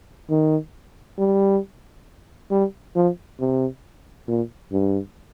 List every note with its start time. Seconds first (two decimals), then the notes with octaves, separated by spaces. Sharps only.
0.30 D#3
1.18 G3
2.51 G3
2.95 F3
3.39 C3
4.28 A#2
4.72 G2